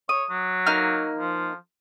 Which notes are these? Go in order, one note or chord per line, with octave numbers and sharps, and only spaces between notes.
C#5 D#6
F#3
A#3 D#4 F6
F3